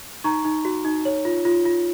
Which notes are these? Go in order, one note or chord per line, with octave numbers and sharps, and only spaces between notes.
D#4 A#5 C#6
D#4
F#4
D#4
C#5
F4
F4
F4